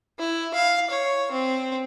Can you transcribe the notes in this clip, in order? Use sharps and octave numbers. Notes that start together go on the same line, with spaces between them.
E4
F5
C#5
C4